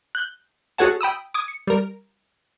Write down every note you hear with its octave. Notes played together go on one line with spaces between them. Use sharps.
F#6 G6
F#4 G#4 A4 C#5 F#5 A5
G5 B5 D#6 E6
D6 D#6 G#6
C#7
G3 A#4